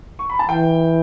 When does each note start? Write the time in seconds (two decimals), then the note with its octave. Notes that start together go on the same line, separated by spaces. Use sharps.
0.19 C#6
0.30 B5
0.39 A5
0.49 E3 G5